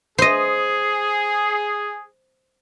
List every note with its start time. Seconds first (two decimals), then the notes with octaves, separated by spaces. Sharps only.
0.18 G#4 C5 D#5